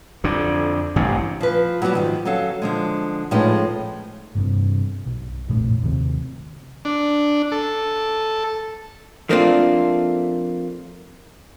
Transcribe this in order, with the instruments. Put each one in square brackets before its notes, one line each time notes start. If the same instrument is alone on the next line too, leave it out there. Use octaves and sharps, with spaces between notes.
[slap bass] F2 D3
A1 G2 C3
[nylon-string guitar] F3 B4
F#3 G3 B3 F#4 G4
G#2 D#3 F3
F#3 C#4 A4 F5
D3 F3 G#3
A2 F3 G#3 C#4 D#4 B4
[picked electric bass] G1 G2 C3
B1
F1 A#1 A2
D#2 C3
[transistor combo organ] D4
A4
[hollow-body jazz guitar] F3 A3 A#3 C4 D4 F4